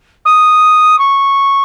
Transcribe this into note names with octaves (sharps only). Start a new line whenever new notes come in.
D#6
C#6